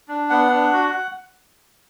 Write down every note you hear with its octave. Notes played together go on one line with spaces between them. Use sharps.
D4
B3 F#5
D4
F#4